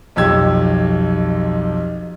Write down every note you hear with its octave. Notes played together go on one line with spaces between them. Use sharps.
B1 F2 G4 E6 G#6